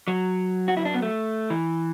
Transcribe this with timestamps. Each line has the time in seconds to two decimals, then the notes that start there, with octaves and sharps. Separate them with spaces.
0.08 F#3
0.68 F#4
0.77 E4
0.85 D4
0.94 B3
1.02 A3
1.50 E3